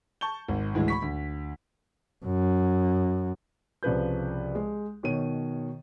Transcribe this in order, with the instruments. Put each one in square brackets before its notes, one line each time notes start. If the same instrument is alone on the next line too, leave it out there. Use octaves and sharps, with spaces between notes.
[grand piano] A5 C#6 G6 G7
G#1
D2 A2 E3 G#3
B5 C#6 B6
D2
[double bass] F#2
[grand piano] C2 C#3 F3 B4 G6
G#3
B2 D#3 C#5 D#7